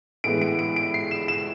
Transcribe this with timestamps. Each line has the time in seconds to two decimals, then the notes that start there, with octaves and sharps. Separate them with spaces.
0.24 A2 E3 G#3 B3 D7
0.42 D7
0.59 D7
0.76 D7
0.94 C7
1.11 E7
1.28 E7